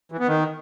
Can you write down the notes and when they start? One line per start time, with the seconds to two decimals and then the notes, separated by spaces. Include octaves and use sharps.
0.12 E3
0.20 B3
0.27 D#3